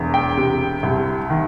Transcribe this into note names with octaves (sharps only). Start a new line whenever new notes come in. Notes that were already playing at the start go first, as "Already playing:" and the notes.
Already playing: E1 E2
G5
C3
C2
D#3